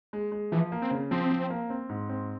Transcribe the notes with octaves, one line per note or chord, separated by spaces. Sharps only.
G#3
G#3
E3 F3
A#3
C4
C#3
F3 C4
F3
A#3
C4
G#2
C4